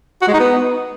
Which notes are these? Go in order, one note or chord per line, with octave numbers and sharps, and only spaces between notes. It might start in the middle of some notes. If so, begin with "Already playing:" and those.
F#4
G#3
D#4
B3